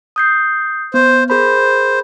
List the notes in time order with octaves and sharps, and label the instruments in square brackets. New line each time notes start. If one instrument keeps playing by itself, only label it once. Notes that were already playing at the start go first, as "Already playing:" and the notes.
[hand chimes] D#6 G6 C7
[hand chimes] B3 [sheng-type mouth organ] C5
[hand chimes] G#4 A#4 B5 [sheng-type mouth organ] C5